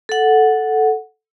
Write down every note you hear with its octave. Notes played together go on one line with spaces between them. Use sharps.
A4 F#5